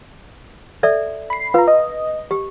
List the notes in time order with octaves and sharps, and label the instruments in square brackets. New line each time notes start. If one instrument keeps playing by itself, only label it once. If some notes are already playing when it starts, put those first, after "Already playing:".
[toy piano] A4 D5 E5
[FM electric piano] B5 C7
[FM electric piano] F4 A#5 [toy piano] B4
[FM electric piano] D#5
[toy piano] G4